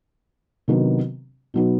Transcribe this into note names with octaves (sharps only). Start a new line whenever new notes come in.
C3 D#3 F#3 B3 D4
B2 F#3 B3 D#4